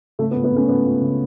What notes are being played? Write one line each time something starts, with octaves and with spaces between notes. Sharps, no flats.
C#3 A3
B3
C#2
B3
C#3 A3 C#4
C#2 B3
C#2
C#3